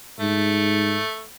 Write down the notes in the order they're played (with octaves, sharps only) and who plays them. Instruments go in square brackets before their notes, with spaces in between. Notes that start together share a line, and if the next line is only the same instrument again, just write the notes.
[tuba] G#2 [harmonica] A3